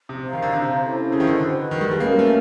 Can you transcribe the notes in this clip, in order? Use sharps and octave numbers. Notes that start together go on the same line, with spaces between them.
C3
C5 F5 A#5
D#3
D3
C3
C#4 E4 A4 C5
C#3
D#3
D3
F#4 B4 D#5
D#3
G3
G#3
A#3 C#4 F#4 A#4
A3